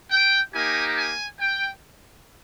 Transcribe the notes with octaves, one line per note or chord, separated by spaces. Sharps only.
G5
A#3 D#4 G4 G#5
G#5
G5